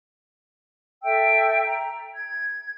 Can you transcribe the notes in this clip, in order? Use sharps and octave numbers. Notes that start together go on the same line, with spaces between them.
A4 E5 G5 E6
A#5
G#6